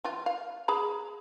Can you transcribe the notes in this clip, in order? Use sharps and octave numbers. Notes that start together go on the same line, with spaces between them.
E3 F4
F5
G#4 A#5 B5